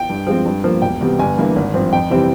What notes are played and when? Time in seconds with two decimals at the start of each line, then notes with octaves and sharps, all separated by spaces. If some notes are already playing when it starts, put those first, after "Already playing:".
Already playing: G5
0.09 G2
0.27 F3 G#3 C4
0.46 G2
0.64 F3 A#3
0.82 E1 G5
1.01 E2 C3 G3
1.19 G1 G#5
1.38 G2 E3 A#3
1.56 G#1
1.74 G2 F3 C4
1.92 F2 G5
2.10 C3 E3 G3 C4